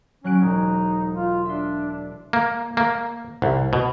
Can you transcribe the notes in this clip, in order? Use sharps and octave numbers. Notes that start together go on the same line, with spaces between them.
F#3 C#4 F#6 D7
E1 D#4
F4
D4 E5 C6
A#3
A#3
C2
B2